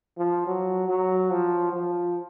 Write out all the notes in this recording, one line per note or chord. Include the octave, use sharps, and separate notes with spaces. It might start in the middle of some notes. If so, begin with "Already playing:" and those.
F3
F#3
F#3
F3
F3